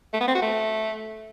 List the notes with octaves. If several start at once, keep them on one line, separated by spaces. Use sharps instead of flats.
A3
B3
C4
F#4
A3